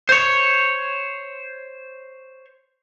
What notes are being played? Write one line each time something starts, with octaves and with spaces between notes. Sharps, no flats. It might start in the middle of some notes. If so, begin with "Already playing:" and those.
C5 C#5